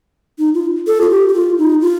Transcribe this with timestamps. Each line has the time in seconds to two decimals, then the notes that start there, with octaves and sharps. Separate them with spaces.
0.39 D#4
0.54 F4
0.87 A4
1.01 F4
1.10 G4
1.28 G4
1.34 F4
1.58 D#4
1.81 F4